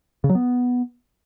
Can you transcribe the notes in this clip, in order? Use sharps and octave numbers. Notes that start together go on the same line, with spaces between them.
C#3
F#3
B3